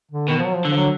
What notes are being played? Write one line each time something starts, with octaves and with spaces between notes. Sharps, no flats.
D3
B2 D#3
F3
F#3
F3
D3
F3
F#3